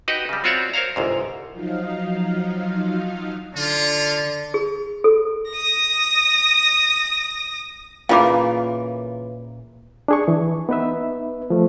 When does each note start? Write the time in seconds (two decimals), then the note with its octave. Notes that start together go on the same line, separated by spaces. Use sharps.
0.08 D#4 F#4 G4 B4 D#5
0.29 C#3 G3
0.44 C4 F4 F#4 C#5 D5 E5
0.74 A#4 C5 C#5 F5 A#5
0.96 G1 C2 G#2
1.52 F3 F#3 D#4 F5
3.56 D3 F4
4.54 G#4
5.04 A4
5.51 D#6 A#6
8.09 A#2 C#3 E3 F4 A#4 F5 B5 D6
10.08 D4 G#4 C#6
10.28 E3
10.69 B3 D#4 B4 E5
11.50 F3 A3